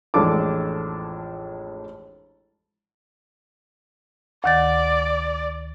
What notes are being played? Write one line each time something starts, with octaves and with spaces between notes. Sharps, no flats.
A1 F2 G#3 D4 A4 D6
D2 D#3 D5 A6